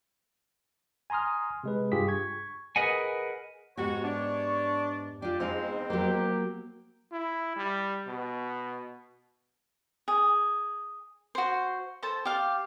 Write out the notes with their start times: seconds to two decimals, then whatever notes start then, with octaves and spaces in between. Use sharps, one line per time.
1.10 G#5 A#5 C6 D#6 F6
1.64 C3 G#3 B4
1.92 G2 F4 G4 G#4 B6
2.08 C#6 G#6
2.76 G#4 A#4 B4 D#5 F#5 G#5
3.77 G#2 B3 F#4 G4 C#5
4.04 D4
5.22 D4 F4 G4
5.40 E2 G#2 G#3 C4 D#4 F5
5.90 F#3 A#3 G4
7.12 E4
7.57 G3
8.07 B2
10.08 G#4
11.35 F#4 C5
12.03 A4 C5 A5
12.25 G4 F5